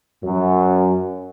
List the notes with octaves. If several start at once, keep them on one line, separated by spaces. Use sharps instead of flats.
F#2